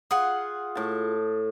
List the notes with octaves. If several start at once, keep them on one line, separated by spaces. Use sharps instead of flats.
F4 G#4 F#5 D#6
A2 A5